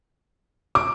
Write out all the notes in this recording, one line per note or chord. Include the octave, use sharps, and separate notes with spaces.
D6